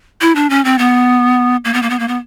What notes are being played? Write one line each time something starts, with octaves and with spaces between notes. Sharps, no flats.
E4
D4
C#4
C4
B3
A#3
B3
A#3
B3
A#3
B3